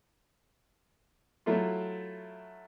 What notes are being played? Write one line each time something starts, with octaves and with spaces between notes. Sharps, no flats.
F#3 A3 E4 F4